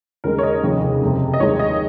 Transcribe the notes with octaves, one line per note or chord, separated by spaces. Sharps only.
D#2 C#3 G#3 A#4
C#5
D#5
F1 D#2 C#3 F3
F#1 F2 C3
D#5
D#2 D#3 G#3 C#5
D#5